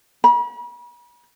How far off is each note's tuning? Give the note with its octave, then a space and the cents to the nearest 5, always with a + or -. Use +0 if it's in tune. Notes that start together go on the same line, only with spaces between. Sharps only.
B5 -45